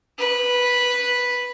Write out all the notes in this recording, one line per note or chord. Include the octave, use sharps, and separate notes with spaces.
B4